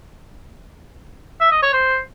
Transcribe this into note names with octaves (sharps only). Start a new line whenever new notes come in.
E5
D#5
C#5
C5